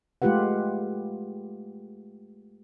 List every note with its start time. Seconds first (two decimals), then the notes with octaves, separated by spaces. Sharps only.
0.22 G#3 A3 F4 G4 B4 F#5